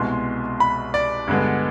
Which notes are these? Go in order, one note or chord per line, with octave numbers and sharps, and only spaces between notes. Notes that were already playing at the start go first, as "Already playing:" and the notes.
Already playing: C2 B2 G#3 C6
B5
D5
G2 D3 G#3 B3